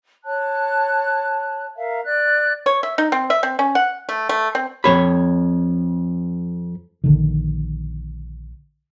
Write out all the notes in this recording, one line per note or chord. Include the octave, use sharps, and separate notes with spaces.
C#5 A5 F#6
A#4 E5 F5
D5 F#6
C#5
E5
D#4
C4
E5
C4
C#4
F#5
A3
A3
C4
F2 C#5 B5
A#1 D3 D#3